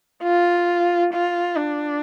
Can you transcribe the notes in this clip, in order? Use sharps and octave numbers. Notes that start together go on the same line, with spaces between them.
F4
F4
D4